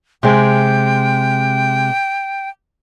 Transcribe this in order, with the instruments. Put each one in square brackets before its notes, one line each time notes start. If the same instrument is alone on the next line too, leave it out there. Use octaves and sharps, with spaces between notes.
[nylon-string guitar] C3 G#3 [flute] G5